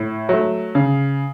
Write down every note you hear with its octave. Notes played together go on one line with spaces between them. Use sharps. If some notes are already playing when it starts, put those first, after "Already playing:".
Already playing: A2
F#3 A3
C#3